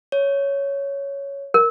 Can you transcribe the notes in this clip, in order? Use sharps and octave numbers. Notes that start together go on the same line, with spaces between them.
C#5
A#4